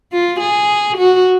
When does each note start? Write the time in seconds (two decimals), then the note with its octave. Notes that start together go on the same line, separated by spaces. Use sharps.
0.12 F4
0.40 G#4
0.98 F#4